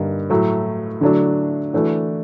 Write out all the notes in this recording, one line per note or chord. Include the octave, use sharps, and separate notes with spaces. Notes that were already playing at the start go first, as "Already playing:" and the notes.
Already playing: G2 D3 G3 A#3 D#4
A2 F#3 A3
D3 F#3 A3 D4
E3 A3 D4 F#4